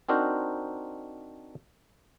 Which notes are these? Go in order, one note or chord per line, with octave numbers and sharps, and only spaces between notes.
C4 D4 D#4 F#4 A#4 C5